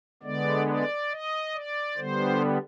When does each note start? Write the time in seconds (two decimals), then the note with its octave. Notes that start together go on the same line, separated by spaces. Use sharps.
0.23 D3 G#3 B3 D5
0.67 D5
1.10 D#5
1.54 D5
1.97 D3 G3 B3 C5